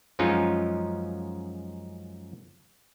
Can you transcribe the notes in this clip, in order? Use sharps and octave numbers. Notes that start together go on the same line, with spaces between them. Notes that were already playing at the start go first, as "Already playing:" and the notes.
F#2 F3 G#3 C#4 D#4 F4